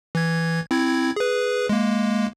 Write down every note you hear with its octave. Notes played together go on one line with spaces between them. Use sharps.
E3 G#6
C4 E4 G#6
G#4 B4
G#3 A#3